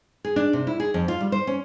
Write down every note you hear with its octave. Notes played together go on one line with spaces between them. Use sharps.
G#4
D4
C3
E4
G#4
F2
F4
G3
C5
C#4